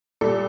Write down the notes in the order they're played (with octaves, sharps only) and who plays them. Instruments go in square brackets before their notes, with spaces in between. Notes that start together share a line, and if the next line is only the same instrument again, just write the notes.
[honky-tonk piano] A#2 G3 A4